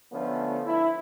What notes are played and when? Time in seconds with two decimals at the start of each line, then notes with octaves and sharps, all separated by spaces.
0.12 D3 F3 A3 B3 C#4
0.65 E4